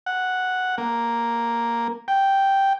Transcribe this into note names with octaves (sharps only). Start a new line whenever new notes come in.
F#5
A#3
G5